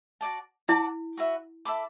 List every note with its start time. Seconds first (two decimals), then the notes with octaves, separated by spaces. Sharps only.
0.21 F#4 A4 D5 A5
0.68 E4 D5 F#5 A5 D6
1.17 F#4 B4 E5
1.65 A4 E5 B5 D6